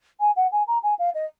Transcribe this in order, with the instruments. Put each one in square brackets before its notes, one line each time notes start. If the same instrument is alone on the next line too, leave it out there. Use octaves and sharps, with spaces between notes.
[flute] G#5
F#5
G#5
A#5
G#5
F5
D#5